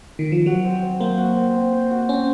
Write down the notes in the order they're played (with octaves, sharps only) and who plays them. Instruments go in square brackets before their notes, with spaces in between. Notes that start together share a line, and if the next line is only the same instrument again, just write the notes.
[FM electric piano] D#3
F3
[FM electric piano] F#3 [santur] F#4
[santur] C4
C4
[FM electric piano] A#3 [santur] C5
[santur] F#4
C4
C4
C5
F#4
[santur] C4 [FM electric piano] C#4